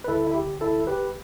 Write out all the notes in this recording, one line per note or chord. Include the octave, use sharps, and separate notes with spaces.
B4
D2 D3 G3 E4 A4
E4
G4
E4 A4
G4 B4